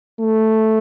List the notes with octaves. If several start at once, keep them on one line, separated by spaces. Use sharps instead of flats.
A3